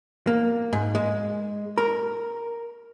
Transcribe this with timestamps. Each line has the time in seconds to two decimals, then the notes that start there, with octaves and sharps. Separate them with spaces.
0.27 A#3
0.73 G#2
0.95 G#3
1.78 A#4